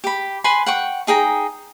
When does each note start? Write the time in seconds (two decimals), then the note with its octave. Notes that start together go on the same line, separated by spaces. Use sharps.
0.04 G4 B5
0.44 B4 G#5 B5 C6
0.66 F#5 G5 C#6
1.07 D#4 G#4 G5 A#5